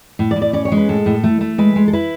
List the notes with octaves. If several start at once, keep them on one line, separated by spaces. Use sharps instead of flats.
A2
D5
A2
D5
C#4 D5
C#5
G#3
B4
A2 A4
A2
A3
A3
G#3 B4
G#3
A4
E4 B4